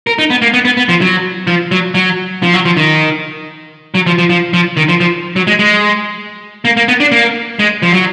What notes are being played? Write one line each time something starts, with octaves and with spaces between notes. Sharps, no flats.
A#4
D#4
B3
A#3
B3
B3
B3
F3
F#3
F3
F#3
F#3
F3
F#3
F3
D#3
F#3
F3
F3
F3
F3
D#3
F3
F3
F#3
G#3
G#3
A#3
A#3
B3
D4
A#3
G#3
F3
F#3